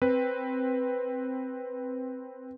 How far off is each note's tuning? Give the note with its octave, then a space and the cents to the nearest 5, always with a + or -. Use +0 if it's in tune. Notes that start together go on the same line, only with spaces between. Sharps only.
C4 +0 B4 +0